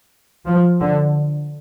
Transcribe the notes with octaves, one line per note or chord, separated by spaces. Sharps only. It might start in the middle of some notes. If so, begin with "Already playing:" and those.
F3
D3